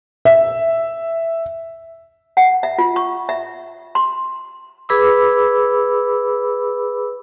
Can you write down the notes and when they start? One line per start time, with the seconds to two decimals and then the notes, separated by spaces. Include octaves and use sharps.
0.25 E5
2.37 F#5
2.63 E5
2.78 F4
2.96 C#6
3.29 E5
3.95 C6
4.89 G#4 B4 B5 D6 E6